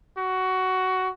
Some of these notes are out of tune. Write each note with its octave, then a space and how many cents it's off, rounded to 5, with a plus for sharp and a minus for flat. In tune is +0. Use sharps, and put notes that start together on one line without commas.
F#4 +15